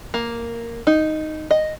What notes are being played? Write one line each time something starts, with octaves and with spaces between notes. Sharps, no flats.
A#3
D#4
D#5